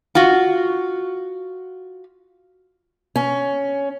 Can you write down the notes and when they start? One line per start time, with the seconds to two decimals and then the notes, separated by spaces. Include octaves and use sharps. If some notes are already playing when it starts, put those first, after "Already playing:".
0.15 F4 F#4
3.16 C#4